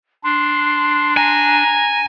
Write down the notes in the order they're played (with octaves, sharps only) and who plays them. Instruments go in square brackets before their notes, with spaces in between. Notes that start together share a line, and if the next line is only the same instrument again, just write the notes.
[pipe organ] D4 [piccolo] C6
[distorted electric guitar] G#5 [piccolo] A#5